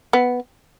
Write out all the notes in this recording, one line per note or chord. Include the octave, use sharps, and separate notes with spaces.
B3